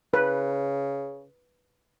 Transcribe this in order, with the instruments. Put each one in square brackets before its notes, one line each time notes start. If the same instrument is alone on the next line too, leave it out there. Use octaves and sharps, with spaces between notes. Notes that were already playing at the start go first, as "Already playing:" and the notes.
[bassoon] C#3 [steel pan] B4